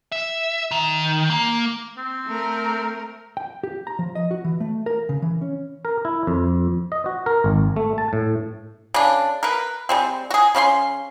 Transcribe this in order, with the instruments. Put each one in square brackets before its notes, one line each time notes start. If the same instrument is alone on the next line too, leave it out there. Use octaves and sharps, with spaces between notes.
[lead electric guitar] E5
D#3
A#3
[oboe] C4
[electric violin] A3 A#4
[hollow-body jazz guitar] G5
G4
A#5
F3
D#5
F#4
E3
A3
A#4
C#3
E3
C#4
[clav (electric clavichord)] A#4
E4
F2
D#5
F#4
A#4
G#1
A3
A5
A2
[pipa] C#3 D4
A#4 B4
G3 G#3 C4
F#4 G#4
C#3 C#4 F#4 C6